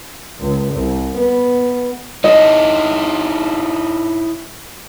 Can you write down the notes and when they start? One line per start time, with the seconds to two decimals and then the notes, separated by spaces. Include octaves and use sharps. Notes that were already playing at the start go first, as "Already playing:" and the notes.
0.39 C#2
0.73 C2
1.17 B3
2.24 D#4 E4 C#5 D#5